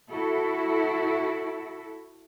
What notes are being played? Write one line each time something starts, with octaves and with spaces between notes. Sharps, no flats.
E4 F#4 A4